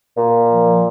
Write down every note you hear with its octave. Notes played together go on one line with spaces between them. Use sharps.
A#2
F3